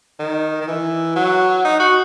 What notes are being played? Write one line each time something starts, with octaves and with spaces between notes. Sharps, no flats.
D#3
D#3
E3
F#3
D#4
F#4